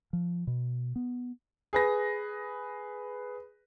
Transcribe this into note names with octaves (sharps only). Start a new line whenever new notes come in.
F3
B2
B3
G#4 B4 A#6